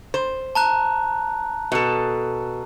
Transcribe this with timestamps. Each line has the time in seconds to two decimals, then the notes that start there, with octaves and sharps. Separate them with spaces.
0.14 C5
0.55 A5 A#5 F#6
1.72 B2 A4